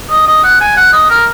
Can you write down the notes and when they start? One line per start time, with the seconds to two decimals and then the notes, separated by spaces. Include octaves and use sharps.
0.10 D#5
0.27 D#5
0.44 F#5
0.61 G#5
0.77 F#5
0.93 D#5
1.10 A#4